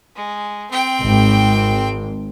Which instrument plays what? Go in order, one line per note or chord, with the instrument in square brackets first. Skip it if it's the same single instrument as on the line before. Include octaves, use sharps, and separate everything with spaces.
[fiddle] G#3
C4 G5
[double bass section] G#1